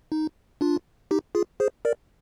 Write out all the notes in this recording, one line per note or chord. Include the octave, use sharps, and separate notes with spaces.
D#4
D4 F4
D#4 G4
F4 G#4
G#4 C5
A#4 D5